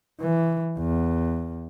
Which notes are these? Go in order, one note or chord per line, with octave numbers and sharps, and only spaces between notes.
E3
E2